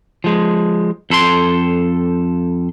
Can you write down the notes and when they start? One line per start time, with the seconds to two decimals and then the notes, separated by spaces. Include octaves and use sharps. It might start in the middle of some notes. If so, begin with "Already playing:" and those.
0.24 F3 G#3
1.10 F2 A4 B5 C6